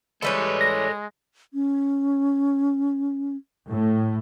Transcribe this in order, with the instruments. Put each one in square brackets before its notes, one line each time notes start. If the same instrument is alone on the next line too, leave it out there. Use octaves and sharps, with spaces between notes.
[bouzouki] E3 G3 C#4 [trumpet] G#3 [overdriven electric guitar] A4 B4
[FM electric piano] A#6
[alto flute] C#4
[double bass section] A2